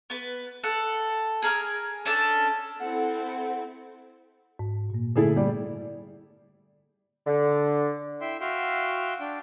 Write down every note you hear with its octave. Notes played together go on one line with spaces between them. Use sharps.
B3 B4
A4 F#5
G#4 A#4 G#5 F6
C#4 D4 A4 A5
C4 E4 A4 F#5
G#2
A#2 A#3
D3 A3 E4 G#4 A4
G3 D5
D3
E4 E5 G5 C6
F#4 E5 F5 G5 C6
D4 G5